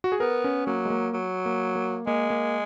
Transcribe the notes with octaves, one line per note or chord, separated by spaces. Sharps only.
F#4
G#4
B3 A#4
C#4
F#3 A#3
G#3
A#3
F#3
A#3
A#3
G#3 A#3
A#3